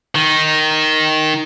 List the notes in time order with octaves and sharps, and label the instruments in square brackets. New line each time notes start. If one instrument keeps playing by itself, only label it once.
[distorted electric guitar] D#3